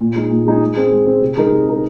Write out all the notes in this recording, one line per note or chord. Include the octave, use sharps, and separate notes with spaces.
A#2
G#3 D#4 G#4
A#2
G#3 D#4 G#4
G#3
C4 G#4
G#3
C4 G#4
C3
G#3 D#4 A#4
C3
G#3 D#4 A#4